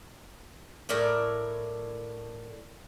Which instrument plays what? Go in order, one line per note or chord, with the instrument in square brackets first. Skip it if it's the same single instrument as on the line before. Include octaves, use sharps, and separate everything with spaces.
[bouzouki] A2 A#4 D5 E5